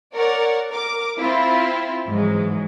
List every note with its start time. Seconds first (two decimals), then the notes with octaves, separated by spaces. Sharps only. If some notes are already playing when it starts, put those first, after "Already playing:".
0.15 A#4 C#5 D5 F#5
0.70 A#4 D6
1.19 C4 E4 F4
2.09 G#2 E3 F#3 G#3